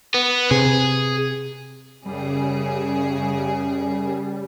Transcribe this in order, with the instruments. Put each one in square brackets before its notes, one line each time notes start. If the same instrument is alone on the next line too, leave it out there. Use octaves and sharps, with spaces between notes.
[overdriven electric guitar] B3
[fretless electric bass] C3 [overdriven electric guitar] G#4
[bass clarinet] F#2 [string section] C#3 G#4 [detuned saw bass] G3